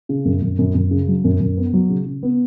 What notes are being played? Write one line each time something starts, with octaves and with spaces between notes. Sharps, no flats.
C#3
F#2
F#2
F#2
F#2
C#3
F#3
F#2
F#2
B3
F#3
C#3
C#3
B3